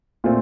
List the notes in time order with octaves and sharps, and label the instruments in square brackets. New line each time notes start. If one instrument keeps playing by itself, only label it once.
[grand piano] A#2 A3 C4 F4